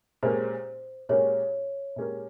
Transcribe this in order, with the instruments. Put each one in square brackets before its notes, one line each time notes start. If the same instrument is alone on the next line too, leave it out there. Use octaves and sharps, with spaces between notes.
[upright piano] A#2 G#3 C#4 G4 A#4 [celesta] C5
[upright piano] A#2 G#3 C#4 G4 A#4 [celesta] C#5
[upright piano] A#2 G#3 C#4 G4 A#4